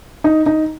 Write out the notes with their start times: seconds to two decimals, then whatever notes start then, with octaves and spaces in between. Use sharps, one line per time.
0.24 D#4
0.46 D#4